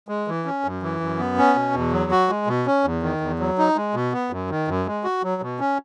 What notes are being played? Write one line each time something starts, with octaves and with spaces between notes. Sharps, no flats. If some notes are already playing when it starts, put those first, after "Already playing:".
G#3
E3
C#4
F#2
E3
F#2
B3
C#4
B2
E2
F#3
F#4
G#3
B2
C#4
E2
D#3
E2
F#3
D#4
G#3
B2
B3
F#2
D#3
F#2
G#3
F#4
F#3
B2
C#4